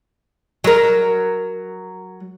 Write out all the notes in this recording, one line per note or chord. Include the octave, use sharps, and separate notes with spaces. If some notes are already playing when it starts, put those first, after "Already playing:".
F#3 A#4